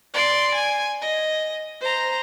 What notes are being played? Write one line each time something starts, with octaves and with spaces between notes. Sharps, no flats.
D5 C6
G#5
D#5
C5 A#5